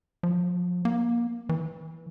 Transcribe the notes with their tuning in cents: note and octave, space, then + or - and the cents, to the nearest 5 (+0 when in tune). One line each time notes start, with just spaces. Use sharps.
F3 +30
A#3 +25
E3 -10